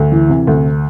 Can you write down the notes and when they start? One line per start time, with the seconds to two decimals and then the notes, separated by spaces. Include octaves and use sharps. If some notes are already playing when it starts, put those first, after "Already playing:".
Already playing: D2
0.12 E3
0.29 C3
0.47 D2